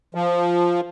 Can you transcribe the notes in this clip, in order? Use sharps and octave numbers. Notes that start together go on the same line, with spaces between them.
F3